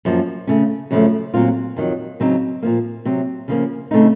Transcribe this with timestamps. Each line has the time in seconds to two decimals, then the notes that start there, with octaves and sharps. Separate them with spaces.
0.05 F#2 F3 A#3
0.47 C#3 A3 C#4
0.91 F#2 C#3 F3 A3
1.34 A#2 F#3 C4 F4
1.76 F2 D#3 F#3
2.20 C#3 F#3 C4 D#4
2.63 A#2 F3 A#3
3.05 C3 F#3 C4
3.48 C#3 F3 A#3 C#4
3.91 C#3 A3 C4 D#4